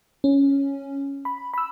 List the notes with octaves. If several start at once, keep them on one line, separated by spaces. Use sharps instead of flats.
C#4
B5
B5 E6